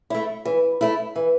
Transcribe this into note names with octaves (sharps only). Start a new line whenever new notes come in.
A3 E4
E3
A3 E4
E3